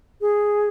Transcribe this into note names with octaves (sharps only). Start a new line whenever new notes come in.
G#4